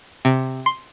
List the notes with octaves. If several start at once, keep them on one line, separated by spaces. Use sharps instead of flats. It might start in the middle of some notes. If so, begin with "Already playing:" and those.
C3
C6